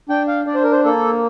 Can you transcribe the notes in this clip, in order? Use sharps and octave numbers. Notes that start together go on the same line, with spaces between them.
D4 G5
F5
D4 D5
C5
A#4
C5
A#3 A4